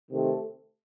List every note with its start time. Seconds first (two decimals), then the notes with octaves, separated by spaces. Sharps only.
0.11 C3 D#3 A3 C4